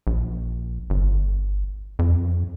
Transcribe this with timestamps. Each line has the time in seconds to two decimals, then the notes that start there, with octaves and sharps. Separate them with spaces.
0.07 A#1
0.90 G1
1.99 F2